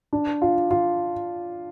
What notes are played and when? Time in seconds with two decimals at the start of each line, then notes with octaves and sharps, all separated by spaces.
0.13 D4
0.42 F4
0.71 F4